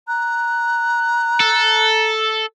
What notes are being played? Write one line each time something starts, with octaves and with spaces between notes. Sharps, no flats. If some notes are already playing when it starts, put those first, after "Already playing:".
A#5 F#6
A4